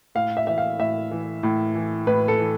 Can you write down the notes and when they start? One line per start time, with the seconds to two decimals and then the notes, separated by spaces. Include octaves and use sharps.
0.15 A2 F5
0.37 E5
0.47 E3 E5
0.58 F5
0.79 A2 E5
1.11 E3
1.43 A2
1.75 E3
2.07 A2 B4
2.28 A4
2.39 E3